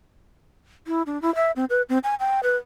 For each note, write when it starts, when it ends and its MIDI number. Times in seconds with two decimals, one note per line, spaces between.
0.87 1.02 64
1.06 1.20 62
1.22 1.34 64
1.35 1.51 76
1.56 1.65 60
1.70 1.82 71
1.89 1.98 60
2.04 2.15 80
2.20 2.40 79
2.43 2.56 71